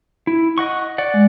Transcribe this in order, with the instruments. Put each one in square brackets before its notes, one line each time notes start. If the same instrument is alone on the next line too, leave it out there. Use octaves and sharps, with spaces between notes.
[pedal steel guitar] E4
D#5 F#5 C#6
D5 F#5
[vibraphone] G#3